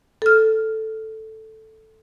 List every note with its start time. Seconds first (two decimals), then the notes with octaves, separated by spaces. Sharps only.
0.22 A4 F6